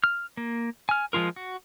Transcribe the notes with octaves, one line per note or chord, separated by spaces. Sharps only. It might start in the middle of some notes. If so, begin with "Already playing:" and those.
F6
A#3
G#5 F6
F3 G#3 F4 A#4
F#4